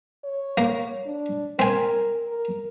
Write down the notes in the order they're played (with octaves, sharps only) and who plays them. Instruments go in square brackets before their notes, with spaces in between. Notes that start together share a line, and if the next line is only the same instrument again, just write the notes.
[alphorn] C#5
[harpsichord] A#3
[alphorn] D4
[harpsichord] C4 G#5 [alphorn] A#4
[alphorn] A#4